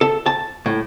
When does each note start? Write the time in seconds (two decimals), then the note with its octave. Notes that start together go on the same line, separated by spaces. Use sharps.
0.01 A4
0.26 A5
0.66 A2